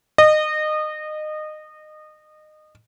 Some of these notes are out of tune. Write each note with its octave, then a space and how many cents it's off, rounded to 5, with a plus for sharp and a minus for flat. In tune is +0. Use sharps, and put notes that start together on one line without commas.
D#5 -25